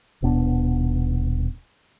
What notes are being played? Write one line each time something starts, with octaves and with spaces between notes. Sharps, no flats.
D#1 B2 B3 D4